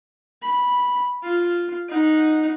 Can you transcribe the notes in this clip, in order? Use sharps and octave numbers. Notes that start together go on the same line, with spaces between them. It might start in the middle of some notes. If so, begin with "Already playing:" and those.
B5
F4
D#4 F#5